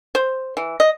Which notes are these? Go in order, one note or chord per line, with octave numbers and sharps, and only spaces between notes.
C5
E3
D#5